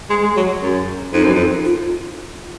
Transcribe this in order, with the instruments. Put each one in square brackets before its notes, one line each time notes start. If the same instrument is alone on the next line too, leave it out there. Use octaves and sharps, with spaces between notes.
[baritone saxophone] G#3
G#3
F#3
F#2
[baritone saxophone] F2 [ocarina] D#4
[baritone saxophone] F#2
F2
[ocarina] F4